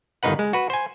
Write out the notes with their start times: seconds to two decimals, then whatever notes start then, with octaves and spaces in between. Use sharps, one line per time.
0.23 G1 D#3 D#4 B4 F#5
0.39 G#3
0.53 F#4 B4
0.70 C5 G#5